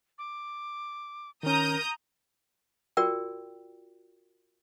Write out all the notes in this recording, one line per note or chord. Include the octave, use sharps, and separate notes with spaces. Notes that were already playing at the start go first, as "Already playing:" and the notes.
D6
D#3 C#4 A#4 A#5 D#6 G6
F4 F#4 A#4 D5 G5